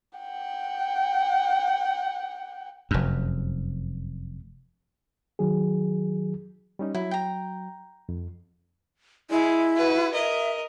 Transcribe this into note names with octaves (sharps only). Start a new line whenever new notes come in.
F#5 G5
F1 F#2
D#3 F#3 G#4
G3 C#4 D#4
F#3 E4
G5 A#5
F2
G#3 E4
F#4 B4
A#4 D#5 E5